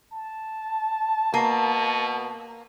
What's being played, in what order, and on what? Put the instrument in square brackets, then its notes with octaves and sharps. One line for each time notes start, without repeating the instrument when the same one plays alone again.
[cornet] A5
[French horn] B2 [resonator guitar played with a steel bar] A#3